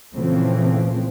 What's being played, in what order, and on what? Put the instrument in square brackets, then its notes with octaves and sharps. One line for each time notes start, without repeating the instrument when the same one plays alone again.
[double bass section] A#2 C#3 E3 F3 A3 C4